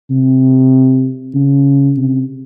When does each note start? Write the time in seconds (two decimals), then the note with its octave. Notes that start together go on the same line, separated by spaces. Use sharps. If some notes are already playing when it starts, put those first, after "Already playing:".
0.11 C3
1.34 C#3
1.97 C3